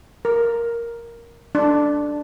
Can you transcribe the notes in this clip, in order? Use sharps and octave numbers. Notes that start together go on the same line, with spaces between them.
A#4
D4